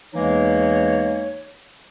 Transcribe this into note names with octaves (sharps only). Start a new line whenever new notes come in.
E2 E3 G#3 A#3 D#4 C#5